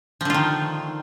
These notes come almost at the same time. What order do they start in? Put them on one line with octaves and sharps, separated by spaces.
F3 D3 F4 D#3